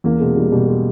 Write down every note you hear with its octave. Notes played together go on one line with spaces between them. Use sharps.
E2 A#3
B2 G#3
E2 G3
B2 G3
G#3